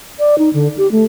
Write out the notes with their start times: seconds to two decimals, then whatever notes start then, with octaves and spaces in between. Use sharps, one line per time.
0.19 D5
0.38 D#4
0.53 D3
0.77 G4
0.92 A3